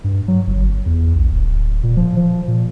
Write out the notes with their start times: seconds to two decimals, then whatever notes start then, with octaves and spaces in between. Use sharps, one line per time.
0.04 G2
0.28 F#3
0.47 G1
0.86 E2
1.15 A#1
1.31 D1
1.83 A#2
1.97 F3
2.17 F3
2.48 A#2